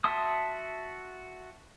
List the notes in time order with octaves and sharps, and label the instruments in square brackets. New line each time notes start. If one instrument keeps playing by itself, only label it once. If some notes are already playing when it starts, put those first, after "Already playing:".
[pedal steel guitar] F#4 E5 A5 C6 D#6